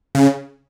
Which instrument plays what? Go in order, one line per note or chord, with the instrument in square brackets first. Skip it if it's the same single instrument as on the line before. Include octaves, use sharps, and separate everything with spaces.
[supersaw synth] C#3